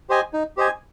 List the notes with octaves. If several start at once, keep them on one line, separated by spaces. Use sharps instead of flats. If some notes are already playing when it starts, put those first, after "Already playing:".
G4 C5 D#5 G#5
D#4
G4 C5 D#5 G#5